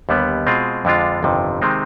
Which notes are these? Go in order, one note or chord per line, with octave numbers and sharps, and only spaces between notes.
D#2 D3 G3 B3
B2 G#3 C4 F4 G#4
F2 D3 G#3 D4 F4
G1 F2 C3 D#3
C3 D#3 G#3 C4 D#4